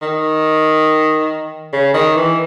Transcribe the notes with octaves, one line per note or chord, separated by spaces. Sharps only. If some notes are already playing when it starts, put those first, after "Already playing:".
D#3
C#3
D#3
E3